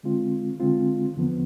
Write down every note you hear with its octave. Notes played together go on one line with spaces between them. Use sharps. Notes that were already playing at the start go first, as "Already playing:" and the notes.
D3 G#3 C4 F4
D3 G#3 C4 F4
E2 D3 F3 B3